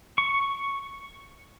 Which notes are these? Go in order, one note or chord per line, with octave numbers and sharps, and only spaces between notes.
C#6